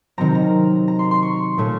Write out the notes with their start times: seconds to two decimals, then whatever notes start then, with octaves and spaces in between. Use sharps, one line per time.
0.18 C3 D#3 F#3 C4 A#5
0.35 A#5
0.88 A#5
0.99 C6
1.11 C6
1.23 C#6
1.58 A#2 A3 C#4